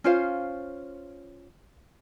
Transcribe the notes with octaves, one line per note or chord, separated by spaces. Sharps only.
C#4 F4 C5 F5